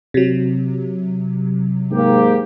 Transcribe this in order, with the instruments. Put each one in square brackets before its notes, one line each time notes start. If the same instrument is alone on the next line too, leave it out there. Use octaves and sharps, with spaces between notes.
[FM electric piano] C3 F#3
[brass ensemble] G#2 A#3 G4